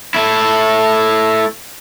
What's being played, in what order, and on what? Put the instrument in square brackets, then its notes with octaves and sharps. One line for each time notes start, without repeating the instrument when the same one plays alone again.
[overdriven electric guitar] A3 E4